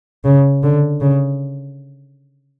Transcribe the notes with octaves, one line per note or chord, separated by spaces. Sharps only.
C#3
D3
C#3